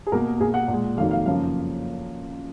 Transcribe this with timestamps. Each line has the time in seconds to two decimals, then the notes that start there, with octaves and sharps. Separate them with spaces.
0.07 G#4
0.12 B2 A#3 A#4
0.40 B2 A#3 G#4
0.54 F#5
0.68 A#2 G#3
0.97 F2 D#3 F#3 A#3 F5
1.11 F5
1.26 F#2 C#3 F3 A#3 F5